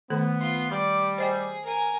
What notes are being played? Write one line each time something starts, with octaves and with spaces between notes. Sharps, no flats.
D#3 A3 B3 A4
F4 C6
G3 D5
G#4 C5 D#5 G5
A#4 G#5